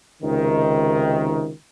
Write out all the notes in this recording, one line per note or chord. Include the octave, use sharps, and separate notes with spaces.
C#2 C3 D#3